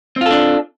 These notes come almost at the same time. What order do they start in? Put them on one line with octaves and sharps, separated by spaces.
C4 F4 A4 D4